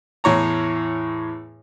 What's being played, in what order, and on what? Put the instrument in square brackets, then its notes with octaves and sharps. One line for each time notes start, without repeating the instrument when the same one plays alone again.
[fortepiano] E2 A2 C#5 A#5